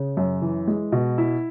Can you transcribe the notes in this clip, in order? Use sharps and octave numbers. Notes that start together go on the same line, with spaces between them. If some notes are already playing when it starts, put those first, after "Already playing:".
Already playing: C#3
F#2
E3
G#3
B2
E4